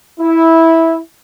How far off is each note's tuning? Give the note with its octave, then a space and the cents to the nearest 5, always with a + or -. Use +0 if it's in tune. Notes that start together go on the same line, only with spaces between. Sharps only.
E4 -10